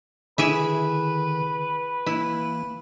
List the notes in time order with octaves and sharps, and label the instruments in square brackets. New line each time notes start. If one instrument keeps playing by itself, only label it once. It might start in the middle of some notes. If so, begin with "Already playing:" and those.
[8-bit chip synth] D3 D#3 [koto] E4 G#4 E5 [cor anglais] B4
[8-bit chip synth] E3 A#3 [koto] E4